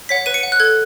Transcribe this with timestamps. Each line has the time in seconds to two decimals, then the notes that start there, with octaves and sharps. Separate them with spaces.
0.09 C#5 F#5 B6
0.26 B4 D#7
0.34 C#7
0.43 F#5
0.52 F#6
0.60 A4 G#6